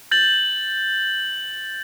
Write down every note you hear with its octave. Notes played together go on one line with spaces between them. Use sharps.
G6 A6 F#7